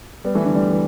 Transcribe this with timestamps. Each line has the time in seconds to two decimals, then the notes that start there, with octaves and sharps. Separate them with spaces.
0.25 G3 B3
0.35 E3 A3
0.45 D3 G3
0.55 D3 G3
0.70 E3